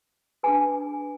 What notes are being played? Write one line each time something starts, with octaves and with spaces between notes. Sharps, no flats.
D4 G#4 B4 G#5